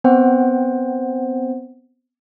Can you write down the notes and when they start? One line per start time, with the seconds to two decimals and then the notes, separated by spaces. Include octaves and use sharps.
0.04 B3 C4 C5 F#5 G5